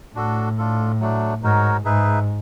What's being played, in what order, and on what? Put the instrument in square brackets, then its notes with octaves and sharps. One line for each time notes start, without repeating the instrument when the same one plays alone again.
[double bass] A2 [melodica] D4 F#4 A4
[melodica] D4 F4 A4
F#3 A3 D4
[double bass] G#2 [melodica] D#4 F#4 A#4 C#5
[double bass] G#2 [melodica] D#4 G#4 B4 E5